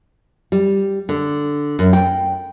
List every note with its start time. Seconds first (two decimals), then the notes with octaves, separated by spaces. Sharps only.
0.52 G3
1.09 D3
1.79 F#2
1.93 G5